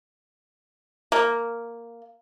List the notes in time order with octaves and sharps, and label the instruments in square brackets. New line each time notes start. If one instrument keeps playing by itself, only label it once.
[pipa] A#3